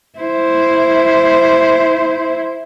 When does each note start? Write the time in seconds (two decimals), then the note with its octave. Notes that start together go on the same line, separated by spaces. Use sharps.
0.19 E4 C5